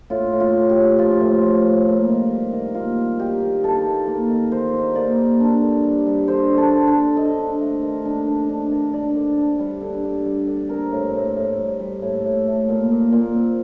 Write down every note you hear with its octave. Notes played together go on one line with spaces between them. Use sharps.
A2 F4
A2
F4
A2
G4
A2
F3 F4
A2
F3
A2
A#3
D#3
G3
D#3
A#3 F4
G3
D#4 G4
D#3
D#4 A4
D#3
A#3
D#3
D#3 C5
D#4
A#3 D5
A#3
D4
D3
G3
G3
D3 C5
D3
A4
D4
A4
D4
D4 D#5
D4
A3
D#3
D4
D4
D4
D#3
D4 D5
D3
D4
G3
D3
D3
G3
D3
C4 A#4
A2
A2
A2
G3
G3
A2
A2
A3
A#2
A#2
A#2
C4